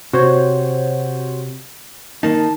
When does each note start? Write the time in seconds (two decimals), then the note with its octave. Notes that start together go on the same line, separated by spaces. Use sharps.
0.13 C3 F#4 C5 C#5
2.23 D#3 A#3 D#4 A5